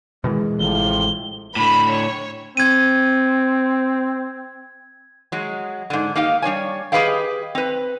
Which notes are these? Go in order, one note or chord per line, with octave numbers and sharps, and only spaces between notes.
B2 D#3 E3 G#3
A1 A2 C3 F3 G7
A2 D3 B5
C#5
C4 G#6 D#7
F#3 G#3
G#2 D3
A#3 D#4 G4 F5
G3 D4 C#5 G#5
G4 G#4 B4 D#5 F5 G5
C4 B4